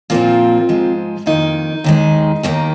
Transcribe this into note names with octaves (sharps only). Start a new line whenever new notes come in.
A#2 F3 A#3 C4 F4
G#2 F3 G#3
F2 D#3 A#3 D#4
D#2 D#3 G#3
D#2 D#3 A#3